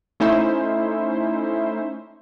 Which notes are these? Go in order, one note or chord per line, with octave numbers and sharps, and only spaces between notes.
A3 C#4 D#4 E4 C5 E5